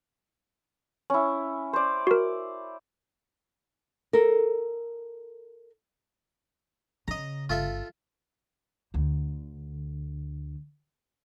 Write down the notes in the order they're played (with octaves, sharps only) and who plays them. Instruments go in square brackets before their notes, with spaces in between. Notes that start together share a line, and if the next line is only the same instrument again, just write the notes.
[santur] C#4 E4
C5 D5
[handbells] F#4 A#4
[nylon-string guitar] A4 A#4
[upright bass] C#3 [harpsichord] D#5 A#5
[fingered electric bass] G1 [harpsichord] F4 A4 E5
[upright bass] D2 D3